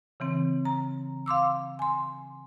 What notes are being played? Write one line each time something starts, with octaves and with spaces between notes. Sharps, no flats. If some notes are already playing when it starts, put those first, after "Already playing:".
C#3 E3 C4
A#5
F5 C6 D6 E6
G#5 C6